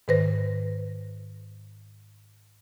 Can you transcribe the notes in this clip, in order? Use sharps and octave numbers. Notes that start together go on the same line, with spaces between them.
G#2 D#3 B4 C5 A#6